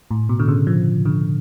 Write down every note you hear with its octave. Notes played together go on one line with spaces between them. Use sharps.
A2
B2
D3
C#3
F3
D3